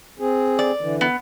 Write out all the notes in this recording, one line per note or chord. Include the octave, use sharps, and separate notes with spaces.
C4 G#4
D5
D3 E3
B3